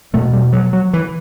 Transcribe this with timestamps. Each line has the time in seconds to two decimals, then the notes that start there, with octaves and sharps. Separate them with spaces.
0.13 E2 B2 A3
0.33 G3
0.53 F#3
0.73 F#3
0.93 E3